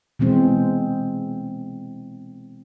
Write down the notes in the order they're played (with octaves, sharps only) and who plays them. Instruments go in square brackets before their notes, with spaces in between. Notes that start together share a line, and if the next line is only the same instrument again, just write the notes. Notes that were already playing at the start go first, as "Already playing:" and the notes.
[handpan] B2 E3 G#3 C4